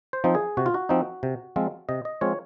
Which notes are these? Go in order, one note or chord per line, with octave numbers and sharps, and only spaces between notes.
C5
F3 C4 D#4
G#4
C3 F#4
F4
F#4
F3 C4 D#4
C3
F3 G#3 C4 F4
C3 D#5
D#5
F3 G#3 C4 F4 C#5